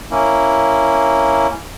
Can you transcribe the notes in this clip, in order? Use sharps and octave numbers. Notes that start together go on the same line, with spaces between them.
A#3 C#4 E4